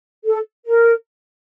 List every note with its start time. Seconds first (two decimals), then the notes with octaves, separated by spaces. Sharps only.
0.25 A4
0.66 A#4